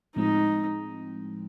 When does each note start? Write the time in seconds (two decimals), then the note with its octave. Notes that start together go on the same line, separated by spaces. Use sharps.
0.16 A2 F3 G#3 C4 D#4